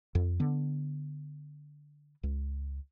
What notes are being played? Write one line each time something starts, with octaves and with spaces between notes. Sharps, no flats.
F2
D3 B3
C#2